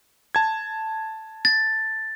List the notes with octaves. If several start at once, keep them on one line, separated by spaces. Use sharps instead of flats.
A5 G#6
A6